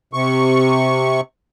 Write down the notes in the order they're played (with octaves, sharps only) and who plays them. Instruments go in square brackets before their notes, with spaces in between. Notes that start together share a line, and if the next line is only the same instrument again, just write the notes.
[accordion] C3 C#6